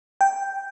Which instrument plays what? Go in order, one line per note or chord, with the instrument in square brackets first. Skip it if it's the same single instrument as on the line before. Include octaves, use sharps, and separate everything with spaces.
[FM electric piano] G5